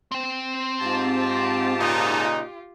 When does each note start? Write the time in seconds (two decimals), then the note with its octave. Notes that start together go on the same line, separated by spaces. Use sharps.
0.12 C4 G5
0.80 G#2 F4 G4 A5
1.79 A#2 C#3 D#4